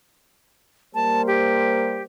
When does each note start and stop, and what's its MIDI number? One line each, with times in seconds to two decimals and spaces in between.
0.95 2.05 55
0.95 2.05 58
0.95 2.05 72
0.95 1.22 81
1.27 2.02 67